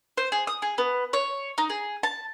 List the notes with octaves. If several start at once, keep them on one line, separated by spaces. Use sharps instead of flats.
C5
G#4
D#6
G#4
B3
C#5
D#4
G#4
A5